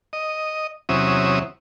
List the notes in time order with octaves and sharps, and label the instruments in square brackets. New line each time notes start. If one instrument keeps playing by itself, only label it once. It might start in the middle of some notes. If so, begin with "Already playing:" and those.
[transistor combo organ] D#5
E2 C3 F#3 C#4 E5 D#6